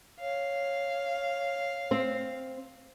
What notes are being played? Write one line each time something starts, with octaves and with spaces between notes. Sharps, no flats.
C#5 F5
C4